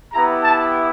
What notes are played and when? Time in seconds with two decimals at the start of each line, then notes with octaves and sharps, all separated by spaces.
0.13 B3 E4 G4 A#5
0.43 A5